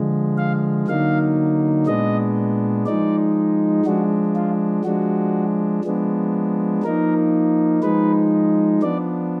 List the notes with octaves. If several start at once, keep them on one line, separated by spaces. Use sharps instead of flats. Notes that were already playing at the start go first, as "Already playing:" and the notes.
Already playing: D3 F3 G#3
F5
D3 F#3 A#3 D#4 F5
A#2 G#3 B3 D4 D#5
F3 G#3 D#4 D5
F3 G#3 D4 F#4
F4
F3 G#3 D4 F#4
F3 G#3 B3 D4
F3 A#3 D#4 A#4
F3 G#3 D#4 B4
F3 B3 D4 D5